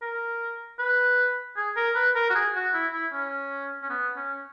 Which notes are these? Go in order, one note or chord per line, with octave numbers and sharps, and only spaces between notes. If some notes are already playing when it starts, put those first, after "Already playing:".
A#4
B4
G#4
A#4
B4
A#4
F#4
G#4
F#4
E4
E4
C#4
C#4
B3
C#4